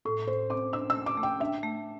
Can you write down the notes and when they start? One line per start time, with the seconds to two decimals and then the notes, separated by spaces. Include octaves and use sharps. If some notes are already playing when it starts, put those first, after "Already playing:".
0.05 A2 A4
0.27 A2 C5
0.50 C4 D6
0.73 D4 E6
0.90 E6
0.95 A3
1.06 D6
1.17 A3
1.23 G5
1.40 D4 E5
1.63 A3